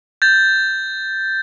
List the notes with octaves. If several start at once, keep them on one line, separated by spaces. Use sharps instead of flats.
G6 A6